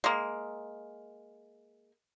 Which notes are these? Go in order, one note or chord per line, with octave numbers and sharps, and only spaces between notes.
G#3 A#3